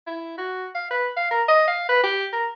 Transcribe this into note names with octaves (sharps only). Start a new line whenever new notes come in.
E4
F#4
F5
B4
F5
A#4
D#5
F5
B4
G4
A#4